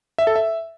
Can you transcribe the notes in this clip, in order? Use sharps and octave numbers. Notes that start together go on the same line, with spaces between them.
E5
A4
E5